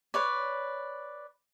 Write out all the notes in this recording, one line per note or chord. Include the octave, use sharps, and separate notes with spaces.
B4 C#5 D5